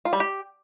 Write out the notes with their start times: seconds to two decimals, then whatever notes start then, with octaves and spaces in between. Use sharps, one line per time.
0.05 F4
0.13 G3
0.20 G4